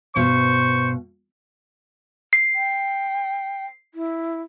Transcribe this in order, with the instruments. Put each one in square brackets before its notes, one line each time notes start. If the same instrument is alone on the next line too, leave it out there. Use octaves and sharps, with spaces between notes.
[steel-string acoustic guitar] G2 B2 [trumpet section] C5 C#6
[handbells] C7
[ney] G5
E4